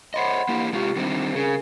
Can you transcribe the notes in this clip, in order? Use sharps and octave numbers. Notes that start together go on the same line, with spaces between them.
C5 C#5 D#5 F#5 B5 C6
A#3 E4 G4
C3 G#3 F4 G4 C#6
D#3 G3 C4 D4
C#3 G#4 A#4 G#5